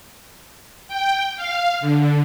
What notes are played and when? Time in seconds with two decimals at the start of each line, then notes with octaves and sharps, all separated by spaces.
0.88 G5
1.36 F5
1.80 D3